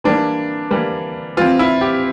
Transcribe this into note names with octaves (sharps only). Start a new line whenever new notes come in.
E3 G3 A#3 D4
E3 G3 A#3
E3 G3 C4 F4
E4
G4